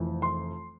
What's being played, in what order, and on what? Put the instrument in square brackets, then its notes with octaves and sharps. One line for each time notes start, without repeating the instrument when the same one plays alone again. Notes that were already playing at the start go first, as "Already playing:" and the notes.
Already playing: [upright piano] F1 F2 E3
C6